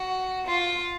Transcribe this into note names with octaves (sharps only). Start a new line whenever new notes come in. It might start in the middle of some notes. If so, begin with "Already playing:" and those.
Already playing: F#4
F4